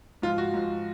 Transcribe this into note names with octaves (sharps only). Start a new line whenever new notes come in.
G#2 F3 F4
F#4
G#2 F3